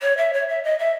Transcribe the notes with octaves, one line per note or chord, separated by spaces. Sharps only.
C#5
E5
C#5
E5
D#5
E5